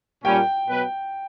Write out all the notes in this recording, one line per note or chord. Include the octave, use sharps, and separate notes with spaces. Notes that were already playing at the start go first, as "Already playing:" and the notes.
A#2 G3 C#4 G5
B2 F#3 B3 F#4 B4